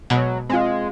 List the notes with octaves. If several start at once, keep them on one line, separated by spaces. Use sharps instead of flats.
B2 F#3 G#3
G#3 C4 F4